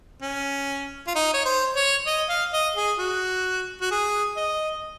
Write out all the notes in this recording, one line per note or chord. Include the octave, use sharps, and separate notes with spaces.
C#4
F4
D#4
C#5
C5
C#5
D#5
F5
D#5
G#4
F#4
F#4
G#4
D#5